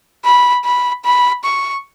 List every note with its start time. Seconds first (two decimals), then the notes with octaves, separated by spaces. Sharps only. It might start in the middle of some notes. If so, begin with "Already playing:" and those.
0.25 B5
0.65 B5
1.05 B5
1.44 C#6